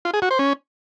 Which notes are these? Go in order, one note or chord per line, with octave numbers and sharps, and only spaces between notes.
F4
G#4
F#4
C5
C#4